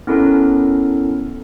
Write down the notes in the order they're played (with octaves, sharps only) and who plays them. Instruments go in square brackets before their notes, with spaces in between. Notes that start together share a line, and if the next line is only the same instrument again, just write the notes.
[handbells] B3 C#4 E4 A4 A#4